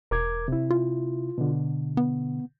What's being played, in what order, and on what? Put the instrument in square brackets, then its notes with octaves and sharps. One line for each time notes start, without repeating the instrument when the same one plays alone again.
[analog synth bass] E1 [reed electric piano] A#4 D6 G#6
[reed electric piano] C3 E4
[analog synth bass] F4
[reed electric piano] B2 D3
[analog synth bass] B3